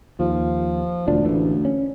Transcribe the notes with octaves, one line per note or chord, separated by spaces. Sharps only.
D#2 F3
E1 D2 D3 D4
A1 E3
C#4